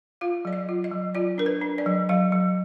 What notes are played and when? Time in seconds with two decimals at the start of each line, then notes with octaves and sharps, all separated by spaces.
0.21 F4 F5
0.45 F#3 D5
0.53 D#5
0.69 F4
0.84 D#5
0.92 F#3
1.15 F4 D5
1.38 D4 A#4
1.46 B4
1.62 D4
1.78 D5
1.86 F#3
2.09 F#3 F5
2.32 F#3